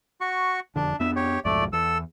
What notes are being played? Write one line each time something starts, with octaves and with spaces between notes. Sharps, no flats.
F#4 C#6
E1 F2 D3 D4
F2 B3 D4 E5
G4 C#5
B1 F2 G#2 A3 D5
E2 A4 E6